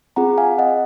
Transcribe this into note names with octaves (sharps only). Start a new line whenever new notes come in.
C4 F4 G#4 F#5 A#5
F5 G#5
D#5 F#5